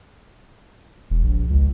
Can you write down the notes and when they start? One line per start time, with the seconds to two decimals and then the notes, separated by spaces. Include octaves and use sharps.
1.10 E1
1.23 A#1
1.50 C#2